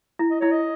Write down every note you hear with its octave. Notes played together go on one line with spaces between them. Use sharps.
E4
D#5
E4 C#5
D#5